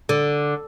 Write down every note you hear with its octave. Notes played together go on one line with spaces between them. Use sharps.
D3